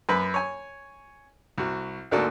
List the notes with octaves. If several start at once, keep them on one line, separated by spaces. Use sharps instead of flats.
F#2 B4
C#5 G#5
C2 F#4
D2 G#2 A#3 D4 F#4 A4